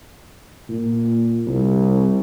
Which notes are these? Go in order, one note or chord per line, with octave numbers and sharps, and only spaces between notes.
A#2
C2